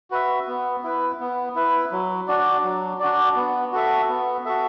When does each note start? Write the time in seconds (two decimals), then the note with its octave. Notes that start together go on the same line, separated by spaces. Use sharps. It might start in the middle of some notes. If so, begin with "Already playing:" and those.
0.11 F#4 B4 E5
0.47 B3
0.84 E4 B4
1.20 B3
1.55 E4 B4
1.91 F#3
2.28 D4 F#4 D5
2.64 F#3
3.00 D4 F#4 D5
3.36 B3
3.72 F#4 A4 E5
4.08 B3
4.45 F#4 A4 E5